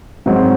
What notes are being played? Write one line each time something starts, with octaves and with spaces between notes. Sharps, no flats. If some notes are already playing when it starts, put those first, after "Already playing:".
G#2 F#3 C4